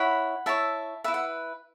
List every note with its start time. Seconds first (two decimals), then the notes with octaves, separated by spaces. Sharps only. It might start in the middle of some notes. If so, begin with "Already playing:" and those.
Already playing: E4 C#5 F#5 B5
0.46 E4 C#5 E5 A5
1.04 E4 B4 E5
1.14 F#5